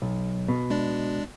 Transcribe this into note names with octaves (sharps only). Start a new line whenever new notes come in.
B1
B2
G#3 D4 D5